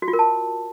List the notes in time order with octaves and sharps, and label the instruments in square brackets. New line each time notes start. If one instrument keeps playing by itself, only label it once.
[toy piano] F#4
F4
A#4
A5